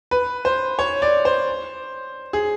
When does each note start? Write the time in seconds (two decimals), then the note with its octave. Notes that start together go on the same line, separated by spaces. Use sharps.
0.11 B4
0.45 C5
0.79 C#5
1.02 D5
1.25 C5
2.33 G#4